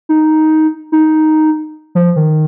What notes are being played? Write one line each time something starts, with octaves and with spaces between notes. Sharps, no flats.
D#4
D#4
F3
D#3